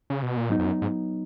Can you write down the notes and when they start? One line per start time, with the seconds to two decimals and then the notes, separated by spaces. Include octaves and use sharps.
0.10 C#3
0.23 B2
0.37 A#2
0.49 G#2 F#3 B3 D#4
0.59 F2
0.66 F#2
0.82 G#2